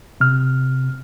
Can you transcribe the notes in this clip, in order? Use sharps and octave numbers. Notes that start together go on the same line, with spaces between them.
C3 F6